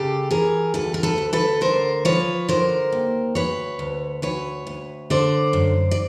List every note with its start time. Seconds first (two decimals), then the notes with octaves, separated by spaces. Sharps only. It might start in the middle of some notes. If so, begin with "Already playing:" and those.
Already playing: C#3 G4 A4
0.31 E3 G#4 A#4
0.74 D2 A4 B4
0.94 A#4
1.03 A4 B4
1.18 D2
1.33 A4 B4
1.61 D3 A#4 C5
2.05 F3 B4 C#5
2.48 D3 A#4 C5
2.92 D#2
3.35 D2 B4 C#5
3.79 D2
4.22 D2 B4 C#5
4.67 D2
5.10 D3 C5 D5
5.53 F#2
5.91 D5